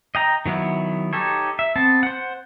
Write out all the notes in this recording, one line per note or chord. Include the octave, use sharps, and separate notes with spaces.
D#5 G5 A#5
D#3 F#3 B3 E4
D#4 G4 A4 C#5
E5
B3 C4 A5
C5 F#5